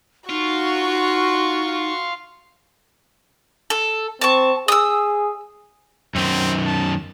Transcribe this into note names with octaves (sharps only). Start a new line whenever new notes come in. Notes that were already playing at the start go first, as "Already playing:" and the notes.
D#4 F4 F#4 C#6
A4
C4 A5 C#6
G#4 D#6 E6
F#2 D#3 C4
A5